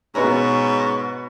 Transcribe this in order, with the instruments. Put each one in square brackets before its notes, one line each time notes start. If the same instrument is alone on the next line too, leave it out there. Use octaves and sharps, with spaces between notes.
[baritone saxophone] G#2 [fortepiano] B2 B3 A#5 [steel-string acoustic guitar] C#4 G#4 [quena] C#6